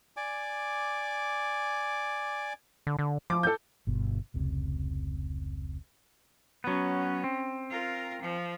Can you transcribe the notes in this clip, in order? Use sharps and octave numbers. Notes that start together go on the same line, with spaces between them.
D5 G#5 D6
D3
D3
F3 D6
A4 G6
G1 B2
F1 C#2 C3
F#3 B3 C#4
C4
F4 A#4
F3